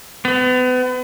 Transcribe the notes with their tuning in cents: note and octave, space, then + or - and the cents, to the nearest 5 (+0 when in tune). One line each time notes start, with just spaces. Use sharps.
B3 +35